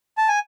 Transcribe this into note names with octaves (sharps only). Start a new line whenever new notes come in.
A5
G#5